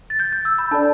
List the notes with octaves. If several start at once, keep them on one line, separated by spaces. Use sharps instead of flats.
A6
G6
G6
E6
B5
D4 A4 D5 A5